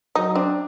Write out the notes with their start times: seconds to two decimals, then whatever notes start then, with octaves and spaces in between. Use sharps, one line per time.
0.15 F#3 D#4
0.35 C4 D4